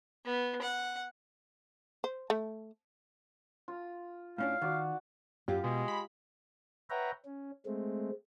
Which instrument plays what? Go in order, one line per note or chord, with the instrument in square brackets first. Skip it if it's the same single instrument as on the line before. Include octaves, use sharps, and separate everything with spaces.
[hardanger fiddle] B3
F#5
[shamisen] C5
A3
[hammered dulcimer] F4
[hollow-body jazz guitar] A2 C#4 D4 [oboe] F5
[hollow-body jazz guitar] D#3 [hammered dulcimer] F#4 D5
[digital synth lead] F#2 [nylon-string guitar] F4 G4
[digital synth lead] B2 [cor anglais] G#3
[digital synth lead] B5
[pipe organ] B4 C#5 E5 F#5 G5 A#5
C#4
G#3 A3 C4